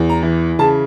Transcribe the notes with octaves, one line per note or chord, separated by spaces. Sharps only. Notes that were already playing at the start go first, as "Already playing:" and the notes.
Already playing: E2
A#5
E3
C#3 A5